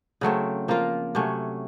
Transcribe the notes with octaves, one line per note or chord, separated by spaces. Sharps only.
C#3 F#3 A3 C4
F3 A#3 F4 A#4
C3 F#3 A3 C#4